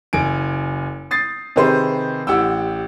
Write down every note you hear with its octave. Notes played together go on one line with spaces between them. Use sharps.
F#1 G#5 D7
D#6 A6 C7
C3 D#3 G#4 B4 C5
A1 G4 F#5 G5 E6